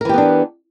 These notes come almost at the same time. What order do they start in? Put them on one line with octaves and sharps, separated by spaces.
A#4 E3 G4 B3 D4